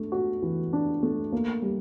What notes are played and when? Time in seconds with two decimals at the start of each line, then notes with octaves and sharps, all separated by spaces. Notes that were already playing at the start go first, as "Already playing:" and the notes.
Already playing: A3 D4
0.12 F#4
0.42 E3
0.73 D4
1.03 A3
1.32 A#3
1.62 G3